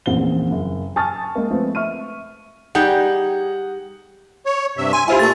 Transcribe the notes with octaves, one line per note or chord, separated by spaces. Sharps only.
A1 E2 A#2 F3 C4 G7
F#1
G#5 A5 C#6 D#6 F6 A6
G#3 A#3
F3 G#3 A3 B3 C4
E5 C#6 F6 D#7
G3 D#4 G4 G#4 F#5 G6
C#5
G2 C3 E5
G#5 C6
E4 F4 G4 C5 G#5
A#2 A3 A5 A6